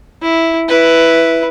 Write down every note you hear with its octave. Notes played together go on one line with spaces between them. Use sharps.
E4
E4 B4